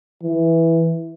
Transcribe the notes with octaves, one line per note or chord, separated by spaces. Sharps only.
E3